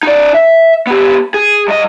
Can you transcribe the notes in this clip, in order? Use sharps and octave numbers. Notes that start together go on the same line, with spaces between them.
D#4 D5
E5
B3 G4
G#4
G2 D#5